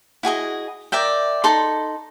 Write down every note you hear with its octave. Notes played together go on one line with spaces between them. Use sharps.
E4 F#4 G#4 D#5
A#4 D5 E5 G5
D#4 A4 B5 C6